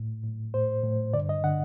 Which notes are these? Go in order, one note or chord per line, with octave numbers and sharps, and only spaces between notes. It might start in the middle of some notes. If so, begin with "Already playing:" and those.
Already playing: A2
A2
A2 C5
A2
G2 D3 D5
D#5
D3 F#5